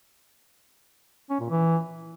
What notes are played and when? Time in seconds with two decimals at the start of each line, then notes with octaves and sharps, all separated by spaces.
1.30 C#4
1.40 A#2
1.50 E3